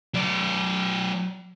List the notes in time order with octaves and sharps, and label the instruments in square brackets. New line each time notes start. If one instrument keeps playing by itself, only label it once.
[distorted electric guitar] F#3 D5